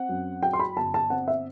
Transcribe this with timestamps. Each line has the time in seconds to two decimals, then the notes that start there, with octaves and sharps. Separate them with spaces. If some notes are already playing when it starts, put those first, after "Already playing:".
Already playing: C4 F#5
0.09 F#2
0.43 F#3 G5
0.53 C6
0.59 B5
0.77 G1 A5
0.94 A5
1.10 C4 F#5
1.28 E5